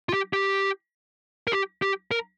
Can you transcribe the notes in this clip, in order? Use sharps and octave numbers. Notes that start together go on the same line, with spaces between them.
F4
G4
G4
A#4
G4
G4
A#4